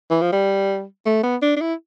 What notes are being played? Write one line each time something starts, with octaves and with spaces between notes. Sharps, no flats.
E3
F3
G3
A3
B3
D4
D4
E4